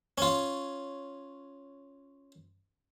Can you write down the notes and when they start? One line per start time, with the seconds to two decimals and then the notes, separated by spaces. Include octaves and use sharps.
0.18 C#4 F4